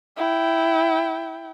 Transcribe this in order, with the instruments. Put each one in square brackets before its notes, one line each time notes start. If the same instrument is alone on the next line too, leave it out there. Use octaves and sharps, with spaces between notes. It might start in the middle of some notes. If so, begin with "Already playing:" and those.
[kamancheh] E4 G5